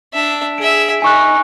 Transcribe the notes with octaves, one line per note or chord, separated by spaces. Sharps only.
D4 E5
G#4 E5 D7
D#4 G#5 C#6 F#6